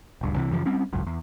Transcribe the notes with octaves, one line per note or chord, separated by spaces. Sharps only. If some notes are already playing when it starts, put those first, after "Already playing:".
D#1 C#2 G2
C2 C3 E3
F#2 C#3 E3 F3
G3 C4 C#4
G#1 C#2 F#2
E2